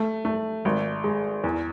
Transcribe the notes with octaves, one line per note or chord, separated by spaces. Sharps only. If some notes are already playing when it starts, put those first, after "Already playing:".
Already playing: A3
A3
G#1
G#3
E2